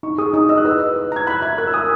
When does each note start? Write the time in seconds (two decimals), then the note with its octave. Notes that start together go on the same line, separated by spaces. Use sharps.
0.03 D#4 C#6
0.18 G#4 D#6
0.34 D#4 D#6
0.49 D#5 E6
0.58 F#6
0.65 B4 E6
0.80 D#5
0.96 B4
1.12 A#5 G#6
1.27 B5 F#6
1.42 E5 G#6
1.58 A#4 F#6
1.67 E6
1.74 G#5 D#6